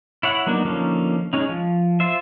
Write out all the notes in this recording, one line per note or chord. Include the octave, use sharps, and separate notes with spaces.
E4 C#5 F#5
F#3 A#3 B3 D4 D#4
D3 F3 A#3 C#4 D#4
G#3 C#4 D#4
F3
F4 C5 E5